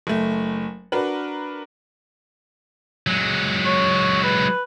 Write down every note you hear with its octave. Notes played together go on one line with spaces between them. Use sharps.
F#1 A3
D4 F#4 A#4 B4
F#3 G#3
C#5
B4